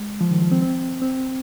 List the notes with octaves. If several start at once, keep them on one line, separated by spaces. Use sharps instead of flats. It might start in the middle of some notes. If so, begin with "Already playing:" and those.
Already playing: G#3
F3
D#3
F3
C4
C4
C4